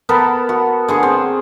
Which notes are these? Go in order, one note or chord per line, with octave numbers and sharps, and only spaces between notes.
B3 A4 A#4 B5
F#4
D3 G#4 C#6
C4